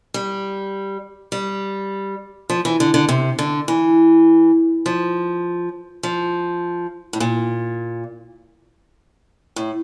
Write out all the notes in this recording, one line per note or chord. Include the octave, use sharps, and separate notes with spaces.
G3
G3
F3
E3
D3
D3
C3
D3
E3
F3
F3
A2
A#2
A2